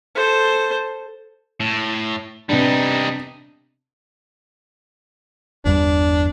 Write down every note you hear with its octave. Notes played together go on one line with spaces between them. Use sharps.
A4 C5
A2
C3 G3 B3 D4 D#4
G1 E2 G3 D4